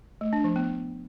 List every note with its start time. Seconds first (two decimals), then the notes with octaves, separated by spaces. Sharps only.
0.21 A3
0.33 D4
0.44 F3
0.56 B3